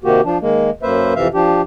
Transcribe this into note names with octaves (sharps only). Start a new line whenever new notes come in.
C3 D#3 A#3 F#4 G4
F3 D4
D#3 G#3 A#3
F#2 A#3 B4 C5 E5
F2 C3 E3 E5 F5
F3 D4 G4